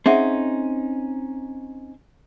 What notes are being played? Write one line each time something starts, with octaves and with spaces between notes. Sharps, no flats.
C4 C#4 D#4 G#4 E5 F#5